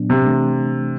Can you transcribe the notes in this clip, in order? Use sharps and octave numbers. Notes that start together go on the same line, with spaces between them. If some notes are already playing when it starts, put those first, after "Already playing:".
Already playing: A#2 F#3 B3 D4
C3
E3 A3 D4